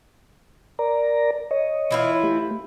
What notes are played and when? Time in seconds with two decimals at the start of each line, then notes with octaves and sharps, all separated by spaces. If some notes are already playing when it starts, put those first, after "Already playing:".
0.79 A#4 D5 A#5
1.51 C#5 D#5
1.91 E3 E4 F4
2.23 A3 G4